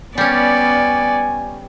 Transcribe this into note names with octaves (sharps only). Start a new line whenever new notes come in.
G3 B3 C#4 D5 G#5